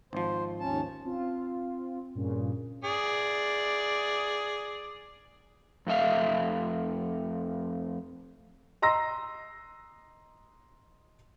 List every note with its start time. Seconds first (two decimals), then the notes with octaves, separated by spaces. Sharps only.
0.13 G#1 F3 C5
0.60 D#2 C#4 A5
1.05 C4 F4
2.15 G2 A#2 C#3
2.84 G#4 D5
5.87 F2 A3 E5 F5
8.82 D#5 A#5 C6 E6 A#6